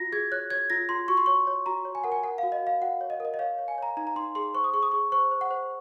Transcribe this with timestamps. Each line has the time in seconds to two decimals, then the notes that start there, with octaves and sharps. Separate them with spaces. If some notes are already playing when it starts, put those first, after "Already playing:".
Already playing: F4 F#4 A#6
0.12 G#4 G#6
0.32 C#5 F#6
0.50 C#5 G#6
0.70 F4 A#6
0.89 F4 C6
1.08 F#4 C#6
1.17 C6
1.26 C#5 C#6
1.47 C#5
1.66 F#4 A#5
1.85 C#5
1.95 G#5
2.04 A#4 F#5
2.12 G#5
2.23 A#4 F#5
2.38 F#4 F5
2.52 D#5
2.62 F#4 F5
2.81 F#4 F#5
3.01 C#5
3.10 D#5
3.20 A#4 D#5
3.34 D#5
3.39 C#5 F5
3.59 C#5
3.68 G#5
3.78 C#5 A#5
3.97 D#4 A#5
4.07 A#5
4.16 D#4 C6
4.35 G#4 C6
4.54 C5 C#6
4.64 D#6
4.74 G#4 C#6
4.83 D#6
4.92 G#4 C#6
5.12 C5 C#6
5.31 C5
5.41 F#5
5.51 C5